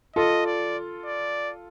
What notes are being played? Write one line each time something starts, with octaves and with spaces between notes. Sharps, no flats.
F4 A4 D#5
D5
D5